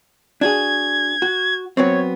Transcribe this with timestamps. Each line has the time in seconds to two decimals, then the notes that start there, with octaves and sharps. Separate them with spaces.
0.41 D4 F#4 G#4 G#6
1.22 F#4
1.77 F#3 B3 C4 C#5